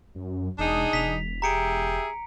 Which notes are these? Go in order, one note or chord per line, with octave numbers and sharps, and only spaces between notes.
F#2
E1 D4 D#4 G#4
E1 B6 F7
G4 G#4 E5 A#5 C#7 D7